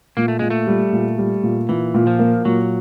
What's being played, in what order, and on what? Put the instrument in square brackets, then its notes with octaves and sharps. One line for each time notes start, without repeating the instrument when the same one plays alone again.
[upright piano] A#2 [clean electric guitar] A#3
[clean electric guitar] A3
[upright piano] A#2 [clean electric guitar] G#3
[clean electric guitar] A3
[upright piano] G3
A#2
G3
A#2
[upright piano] A#2 [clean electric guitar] E3
[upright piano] A#2
[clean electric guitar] F3
[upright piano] A#3
[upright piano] A#2 [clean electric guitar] F#3